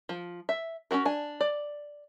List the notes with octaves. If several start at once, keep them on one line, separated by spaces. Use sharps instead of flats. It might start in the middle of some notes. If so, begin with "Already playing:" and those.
F3
E5
C#4 D#4 F#4 A#4
D4 G#5
D5